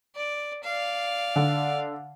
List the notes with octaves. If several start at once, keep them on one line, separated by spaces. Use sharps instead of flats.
D5
D5 F5
D3